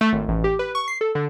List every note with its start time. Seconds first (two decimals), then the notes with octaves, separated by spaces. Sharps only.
0.01 A3
0.13 G#1
0.28 A1
0.44 G4
0.59 B4
0.75 C#6
0.88 C7
1.01 A4
1.15 D3